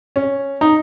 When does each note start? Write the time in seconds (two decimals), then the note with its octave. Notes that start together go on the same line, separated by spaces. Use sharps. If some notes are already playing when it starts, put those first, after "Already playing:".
0.16 C#4
0.61 D#4